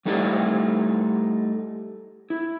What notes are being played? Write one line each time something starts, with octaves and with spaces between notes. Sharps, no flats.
G3 A3 D#4 E4 G4 D5
E4